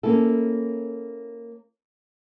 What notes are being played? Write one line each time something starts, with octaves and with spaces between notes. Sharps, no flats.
A#3 C#4 E4 A4